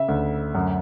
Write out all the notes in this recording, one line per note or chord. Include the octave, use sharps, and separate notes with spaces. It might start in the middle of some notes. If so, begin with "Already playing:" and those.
Already playing: C#3 E5
D2
F#2